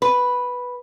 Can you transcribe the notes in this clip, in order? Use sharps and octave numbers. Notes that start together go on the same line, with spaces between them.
B4